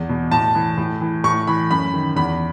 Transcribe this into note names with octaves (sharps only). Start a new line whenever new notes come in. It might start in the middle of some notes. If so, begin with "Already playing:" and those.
Already playing: E2
B2
A2 A5
E3
A2
E3
A2 C#6
E3 B5
F#2 B5
D#3
E2 B5